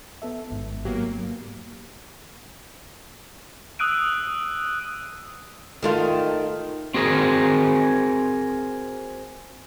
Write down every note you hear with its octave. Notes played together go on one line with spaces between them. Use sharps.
B3 A4 E5
G#1 G#2
G#2 F#3 A#3 B3 G4
D#6 E6 F#6 D7 D#7
D#3 A3 F4
C4 F#4 G#4 A#4